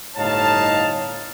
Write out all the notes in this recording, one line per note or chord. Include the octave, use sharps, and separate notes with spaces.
G1 A2 D#4 C#5 F5 A5